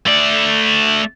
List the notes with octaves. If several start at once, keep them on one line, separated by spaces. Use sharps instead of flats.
A3 D5